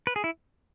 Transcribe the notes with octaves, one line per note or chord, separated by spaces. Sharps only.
B4
G#4
E4